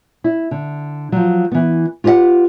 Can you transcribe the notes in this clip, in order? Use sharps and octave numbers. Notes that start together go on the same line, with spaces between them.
E4
D3
F3 F#3
E3 B3
F4 G4 B4 D#5 F#5